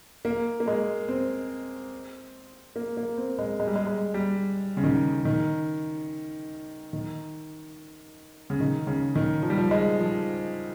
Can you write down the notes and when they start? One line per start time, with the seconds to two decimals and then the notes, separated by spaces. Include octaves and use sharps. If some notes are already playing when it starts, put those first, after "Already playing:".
0.25 A#3
0.60 A#3
0.67 G#3
1.08 C4
2.76 A#3
2.97 A#3
3.17 C4
3.39 G#3
3.60 G#3
3.67 G3
3.75 G#3
3.87 G#3
4.14 G3
4.77 C#3
4.84 D#3
5.25 D#3
6.93 D#3
8.50 C#3
8.60 D#3
8.87 C#3
9.15 D#3
9.43 F3
9.50 G3
9.58 F3
9.71 G#3
9.99 F3